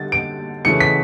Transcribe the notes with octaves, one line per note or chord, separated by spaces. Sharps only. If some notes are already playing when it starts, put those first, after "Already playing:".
Already playing: D3 G3 A6
D7
C#3 E3 A3 C#7
B6